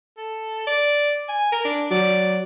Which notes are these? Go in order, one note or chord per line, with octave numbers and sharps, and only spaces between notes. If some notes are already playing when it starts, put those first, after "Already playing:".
A4
D5
G#5
A#4
D4
F#3 D5